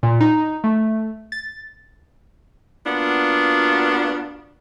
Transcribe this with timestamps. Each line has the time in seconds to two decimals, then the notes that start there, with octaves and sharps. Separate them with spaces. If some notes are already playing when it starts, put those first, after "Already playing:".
0.03 A#2
0.20 D#4
0.64 A3
1.32 A6
2.87 A#3 B3 D4 F4 F#4